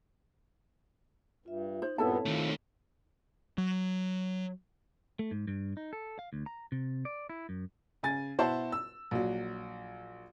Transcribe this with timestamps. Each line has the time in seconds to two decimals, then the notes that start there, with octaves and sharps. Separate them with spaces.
1.46 G2 F4 E5
1.82 D#4 C5
1.98 G2 A#2 B3 C4 E4 A4 C#5 A5
2.25 D#3 F3 A3
3.58 F#3
5.19 A3
5.31 G#2
5.48 G2
5.77 D#4
5.93 A4
6.19 F5
6.33 D2
6.46 A#5
6.72 C3
7.05 D5
7.30 E4
7.49 F#2
8.03 C#3 G#5 A6
8.38 B2 E4 F#4 C5 A5 C6
8.72 E6
9.11 A#1 F#3